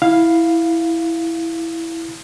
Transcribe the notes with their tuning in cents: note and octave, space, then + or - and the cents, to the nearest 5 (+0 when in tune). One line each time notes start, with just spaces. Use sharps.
E4 +0 F5 +0